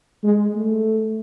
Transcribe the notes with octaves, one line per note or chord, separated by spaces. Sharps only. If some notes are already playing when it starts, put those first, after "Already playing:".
G#3
A3